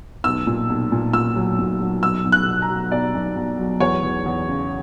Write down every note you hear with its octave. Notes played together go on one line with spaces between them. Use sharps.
B1 E6
A#2
B1
A#2
A#2 E6
F#3
A#2
F#3
B1 E6
B1
F#6
B2
A#5
F#3
B1 D5
B1
B1
F#3
E2 C#5
E2
E2
C#3